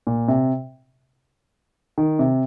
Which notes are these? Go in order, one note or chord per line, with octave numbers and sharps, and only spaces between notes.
A#2
C3
D#3
C3